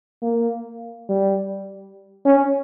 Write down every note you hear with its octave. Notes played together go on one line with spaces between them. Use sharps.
A#3
G3
C#4